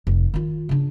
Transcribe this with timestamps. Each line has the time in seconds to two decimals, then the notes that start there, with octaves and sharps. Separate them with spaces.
0.07 F1
0.34 D#3 F4
0.69 C#3 D4